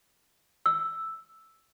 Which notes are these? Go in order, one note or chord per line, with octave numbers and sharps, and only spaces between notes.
E6